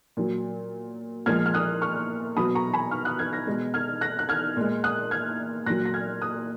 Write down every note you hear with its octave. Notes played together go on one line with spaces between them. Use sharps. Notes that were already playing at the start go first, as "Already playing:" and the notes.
A#2 F#3
A#2 F3 G#3 F6 G#6
F6
D#6 F#6
C#6 F6
B2 F#3 B5 D#6
A#5 C#6
G#5 B5
C#6 F6
D#6 F#6
F6 G#6
F#6 A#6
B2 G#3
F6 G#6
F#6 A#6
F#6
F6 G#6
A#2 G#3
D#6 F#6
F6 G#6
A#2 F#3 F#6 A#6
A#6
F6 G#6
D#6 F#6